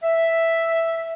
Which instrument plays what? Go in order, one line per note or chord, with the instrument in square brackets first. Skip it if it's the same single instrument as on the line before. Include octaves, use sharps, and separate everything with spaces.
[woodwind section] E5